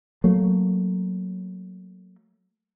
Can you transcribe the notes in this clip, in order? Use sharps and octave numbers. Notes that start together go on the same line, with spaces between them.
F#3 A3 A#3